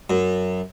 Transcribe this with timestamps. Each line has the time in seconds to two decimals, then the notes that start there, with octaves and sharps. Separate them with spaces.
0.10 F#2